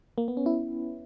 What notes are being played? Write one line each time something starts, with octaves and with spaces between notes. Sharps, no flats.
A#3
B3
C#4
E4